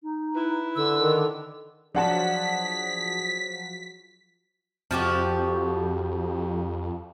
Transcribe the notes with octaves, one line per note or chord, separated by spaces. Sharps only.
D#4
E4 B4
D3 E6
D#3
F3 F#3 D4 F#4 G#4 F#5 A5 B6
F2 F3 F#4 G4